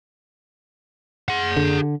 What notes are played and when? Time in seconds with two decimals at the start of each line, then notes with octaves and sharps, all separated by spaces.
1.28 G#4 F#5
1.57 D3